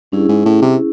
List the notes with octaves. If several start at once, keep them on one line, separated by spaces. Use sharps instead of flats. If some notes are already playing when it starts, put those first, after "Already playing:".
G2 C#4 E4 G#4
G#2
A2
C3